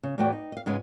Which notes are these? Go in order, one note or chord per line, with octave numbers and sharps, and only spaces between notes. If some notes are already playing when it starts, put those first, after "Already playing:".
C#3
E2 A2 A3 F#4 D5 G5
D#4
D#5 F5
G#2 C#3 G#3 B3 C#4 F4